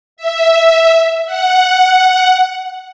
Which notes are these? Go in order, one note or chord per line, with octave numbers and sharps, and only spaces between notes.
E5
F#5